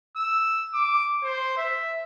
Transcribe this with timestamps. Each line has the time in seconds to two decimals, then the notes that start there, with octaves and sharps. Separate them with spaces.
0.16 E6
0.74 D6
1.23 C5
1.57 E5